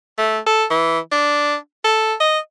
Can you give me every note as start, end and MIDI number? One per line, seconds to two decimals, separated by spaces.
0.18 0.39 57
0.47 0.64 69
0.70 0.99 52
1.12 1.56 62
1.84 2.14 69
2.21 2.39 75